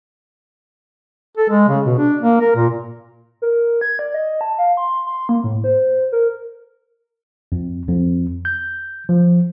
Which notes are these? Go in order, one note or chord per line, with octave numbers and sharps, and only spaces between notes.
A4
G#3
C#3
B2
D4
A#3
A#4
A#2
A#4
G#6
D5
D#5
A5
F5
C6
C6
A#3
A2
C5
A#4
F2
F2
G6
F3